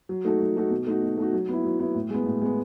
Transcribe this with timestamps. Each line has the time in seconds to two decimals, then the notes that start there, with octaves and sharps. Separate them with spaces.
0.09 F#3
0.25 A3 D#4 F#4 A4
0.40 F#3
0.56 A3 D#4 F#4 A4
0.70 B2
0.87 A3 D#4 F#4
1.02 B2
1.17 A3 D#4 F#4
1.33 F#3
1.49 B3 E4
1.64 F#3
1.79 B3 E4
1.95 A2
2.10 G#3 B3
2.26 A2
2.41 G#3 B3